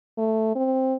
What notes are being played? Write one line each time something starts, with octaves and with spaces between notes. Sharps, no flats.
A3
C4